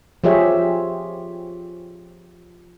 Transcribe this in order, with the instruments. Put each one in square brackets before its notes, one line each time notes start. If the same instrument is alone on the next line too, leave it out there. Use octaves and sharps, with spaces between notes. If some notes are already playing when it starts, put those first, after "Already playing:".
[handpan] F3 F4 G4 G#4 C#5 E5